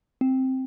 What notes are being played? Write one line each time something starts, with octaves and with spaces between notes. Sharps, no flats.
C4